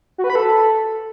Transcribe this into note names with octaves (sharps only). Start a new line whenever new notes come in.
F#4
B4
B5
A4